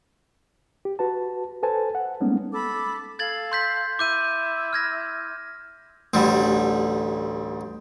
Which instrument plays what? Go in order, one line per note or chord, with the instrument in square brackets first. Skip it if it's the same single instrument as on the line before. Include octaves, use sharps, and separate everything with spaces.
[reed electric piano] G4
F#4 B4 A5
A4 B4 C5 G#5 A5
F#5
G3 G#3 A#3 B3 C#4 D#4
[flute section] A4 B5 D6
[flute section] A4 F5 [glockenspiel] G#6 A6 F#7
[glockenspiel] C6 G6 B6
[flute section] E4 [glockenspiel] D6 G6 D#7
[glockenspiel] F6 G#6 A#6
[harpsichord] A1 D2 D3 G3